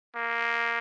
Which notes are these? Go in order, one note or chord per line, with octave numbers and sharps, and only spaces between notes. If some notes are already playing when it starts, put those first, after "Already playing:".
A#3